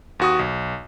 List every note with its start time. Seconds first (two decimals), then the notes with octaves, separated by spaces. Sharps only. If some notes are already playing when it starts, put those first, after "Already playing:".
0.20 D#2 F#4 D#6
0.39 B1